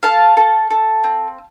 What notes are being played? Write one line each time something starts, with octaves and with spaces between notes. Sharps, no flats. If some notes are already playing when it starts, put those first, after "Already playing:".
A4 F5 A5
A4
A4
C4